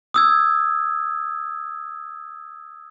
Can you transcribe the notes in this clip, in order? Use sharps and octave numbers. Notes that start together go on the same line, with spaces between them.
D#6 E6 G#6